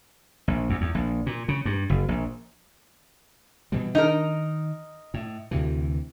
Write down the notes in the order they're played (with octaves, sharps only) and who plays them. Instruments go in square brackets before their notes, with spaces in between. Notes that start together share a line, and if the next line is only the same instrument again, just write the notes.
[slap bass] A#1
E2
E2
A#1
A#2
C#3
G2
F#1
A#1
B2 E3 G3
[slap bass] D#3 [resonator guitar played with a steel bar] D#4 A#4
[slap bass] A2
D2 C3 E3